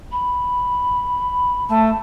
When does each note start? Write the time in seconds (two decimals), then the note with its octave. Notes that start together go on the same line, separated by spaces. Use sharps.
0.12 B5
1.69 A3 A5